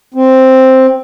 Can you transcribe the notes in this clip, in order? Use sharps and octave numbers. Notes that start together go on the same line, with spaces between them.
C4